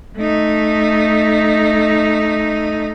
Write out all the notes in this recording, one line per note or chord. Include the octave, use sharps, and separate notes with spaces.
A3 D#4